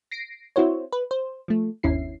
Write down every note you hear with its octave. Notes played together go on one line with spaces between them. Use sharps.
A#6 C7 D7
C4 E4 F#4 C5 C#5
B4
C5
F3 A3
G1 D#2 C#4 E4 C7